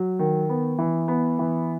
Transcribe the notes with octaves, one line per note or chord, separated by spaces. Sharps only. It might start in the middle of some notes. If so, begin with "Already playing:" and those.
Already playing: F#3
D#3
B3
E3
B3
E3